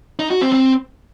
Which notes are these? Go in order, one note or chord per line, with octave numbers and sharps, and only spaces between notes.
D#4
F#4
C4
C4